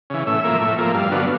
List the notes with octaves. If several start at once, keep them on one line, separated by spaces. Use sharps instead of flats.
C#3 E3
A2 E5
F3 A#3
A2
F3 A#3
G2 F5
D3 F#3 B3